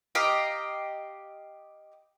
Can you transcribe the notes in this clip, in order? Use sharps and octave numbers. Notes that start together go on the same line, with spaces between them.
G4 D#5 F5 A#5